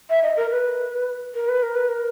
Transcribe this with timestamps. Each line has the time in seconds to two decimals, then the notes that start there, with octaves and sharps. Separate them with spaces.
0.10 E5
0.23 D#5
0.37 A#4
0.51 B4
1.35 A#4
1.49 B4
1.63 A#4
1.75 B4
1.88 A#4